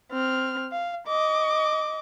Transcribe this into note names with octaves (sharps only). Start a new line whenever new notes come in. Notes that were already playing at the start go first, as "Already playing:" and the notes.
C4 F6
F5
D#5 D6